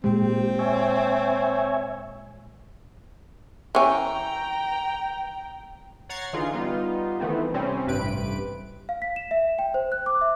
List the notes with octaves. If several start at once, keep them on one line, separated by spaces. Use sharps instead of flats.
A#2 G#3 C4 G4
C#5 E5 G#5
E3 C#4 G5 A#5
C#5 F#5 A#5 G#6 A6 C7
D3 E3 D#4 F4 G#4
G3 B3 D#4 F4
D#3 E3 A3 B3 C4
C3 G3 C4 C#4
A1 G2 C3 B4 D7
F5
B6
E7
E5
G5
C5
F#6
D6
E5